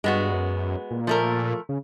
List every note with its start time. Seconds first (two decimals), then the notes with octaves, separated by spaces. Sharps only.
0.04 G2 G#3 B3 F#4
0.33 F#2
0.91 A#2
1.07 F3 A3 A#4
1.69 C#3